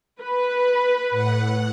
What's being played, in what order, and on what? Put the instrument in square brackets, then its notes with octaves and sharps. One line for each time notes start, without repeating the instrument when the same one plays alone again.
[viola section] B4
[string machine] A2 F#5